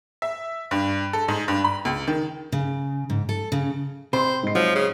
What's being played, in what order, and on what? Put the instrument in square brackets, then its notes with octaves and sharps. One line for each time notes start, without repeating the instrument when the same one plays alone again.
[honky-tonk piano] E5
G2
A4
G#2
G2
B5
C#2
D#3
[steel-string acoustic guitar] C#3
G#2
A4
C#3
[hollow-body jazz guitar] C3 [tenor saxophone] C5 [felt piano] B5 C6
[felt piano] G#2 C7
[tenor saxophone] F3 [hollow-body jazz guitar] F#3
[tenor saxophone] C#3